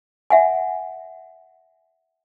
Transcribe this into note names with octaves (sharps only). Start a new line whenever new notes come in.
E5 F#5 G#5